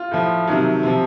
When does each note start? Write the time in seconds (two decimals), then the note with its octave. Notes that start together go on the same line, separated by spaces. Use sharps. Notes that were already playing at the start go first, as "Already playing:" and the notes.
Already playing: F4
0.11 A2 F3
0.47 C3 D#3 F#3
0.83 C3 F3